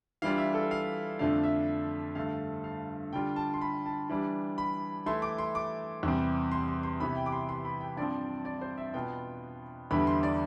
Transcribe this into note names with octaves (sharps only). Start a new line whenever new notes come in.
E3 G3 D4 F4 F5
E5
A4
F5
F2 D3 A3 D4 F5
E5
G2 D3 A3 F5
F5
D3 G3 D4 F4 G5
A5
C6
B5
A5
E3 G3 D4
B5
E3 A3 E4 C6
D6
C6
D6
E2 C3 G3 C4
C6
C6
C6
C3 E3 B3 B5
G5
D6
C6
C6
B5
G5
G2 F3 C4 D5
D5
C5
E5
B2 B3 F4 G5
E2 D3 G3 B3 E4 B5
C6
D5